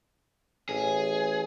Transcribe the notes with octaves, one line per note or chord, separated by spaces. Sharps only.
A1 G#4